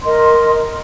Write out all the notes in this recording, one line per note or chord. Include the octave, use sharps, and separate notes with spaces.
A#4 D#5 C6